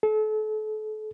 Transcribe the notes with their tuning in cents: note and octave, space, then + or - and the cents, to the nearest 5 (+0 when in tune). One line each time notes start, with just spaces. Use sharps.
A4 -35